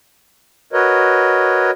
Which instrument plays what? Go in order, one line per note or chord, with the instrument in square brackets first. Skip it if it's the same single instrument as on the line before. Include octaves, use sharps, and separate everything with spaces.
[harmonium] F#4 A#4 B4 C#5 D#5